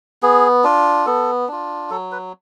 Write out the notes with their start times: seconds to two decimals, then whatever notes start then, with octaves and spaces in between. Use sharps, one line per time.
0.23 B3 G#4
0.64 D4 F4
1.06 B3 A4
1.48 D4 F4
1.91 F#3 A4
2.12 B4